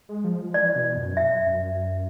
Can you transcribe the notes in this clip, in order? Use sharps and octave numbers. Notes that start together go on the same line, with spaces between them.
G#3
F3
E3 D5
B2
F#2
E5
F#2